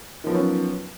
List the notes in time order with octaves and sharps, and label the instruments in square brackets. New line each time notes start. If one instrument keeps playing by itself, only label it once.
[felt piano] D#3
F3
B3
F#3
C#4